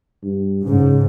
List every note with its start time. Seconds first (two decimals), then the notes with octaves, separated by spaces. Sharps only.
0.23 G2
0.66 G#2 C#3